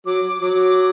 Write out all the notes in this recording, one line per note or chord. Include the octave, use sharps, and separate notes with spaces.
F#3 D6
F#3 D6